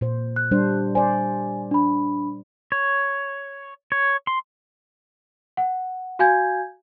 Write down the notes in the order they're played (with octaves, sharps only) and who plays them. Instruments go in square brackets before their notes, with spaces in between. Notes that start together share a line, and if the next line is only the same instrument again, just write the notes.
[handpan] A#2 C5
[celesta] F#6
[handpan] G3 D4 C5
[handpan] C5 D5 [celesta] G#5
[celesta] D4 B5
[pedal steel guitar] C#5
C#5
C6
[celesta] F#5
F#4 F5 G#5 G6 G#6